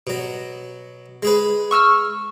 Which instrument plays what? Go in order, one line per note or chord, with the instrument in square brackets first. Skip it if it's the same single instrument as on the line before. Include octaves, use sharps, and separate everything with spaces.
[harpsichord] B2 F#3
G#3 G#4 B4
[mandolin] C#6 E6 F6